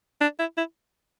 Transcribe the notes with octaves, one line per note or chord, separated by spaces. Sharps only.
D4
E4
E4